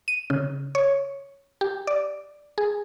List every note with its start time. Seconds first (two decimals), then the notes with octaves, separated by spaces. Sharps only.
0.08 D#7
0.30 C#3
0.75 C#5
1.61 G4
1.87 D5
2.58 G#4